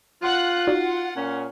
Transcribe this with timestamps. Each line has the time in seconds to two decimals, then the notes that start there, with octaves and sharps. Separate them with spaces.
0.22 F4 F#5 F#6
0.67 D#4 F#4 D5 F#5
1.15 A#2 C#4